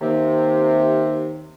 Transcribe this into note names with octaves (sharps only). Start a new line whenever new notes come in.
D#2 C3